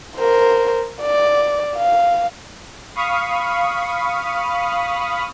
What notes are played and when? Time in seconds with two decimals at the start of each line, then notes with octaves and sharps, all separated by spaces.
0.17 A#4 C5
1.01 D5
1.76 F5
2.96 F5 B5 C#6 D#6